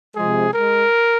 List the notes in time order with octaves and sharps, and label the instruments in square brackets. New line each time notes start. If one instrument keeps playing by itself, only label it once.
[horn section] C3 F3 G#3 G#4
G#3 A#4